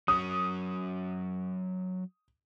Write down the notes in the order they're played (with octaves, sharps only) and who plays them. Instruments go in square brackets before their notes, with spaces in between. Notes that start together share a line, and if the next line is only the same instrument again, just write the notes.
[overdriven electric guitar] F#3 C#4 [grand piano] D#6